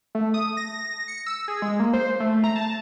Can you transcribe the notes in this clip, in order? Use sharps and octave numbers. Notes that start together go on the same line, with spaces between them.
A3
D#6
A#6
C#7
E6
G#4
G#3
A#3
C5
A3
A#5
A5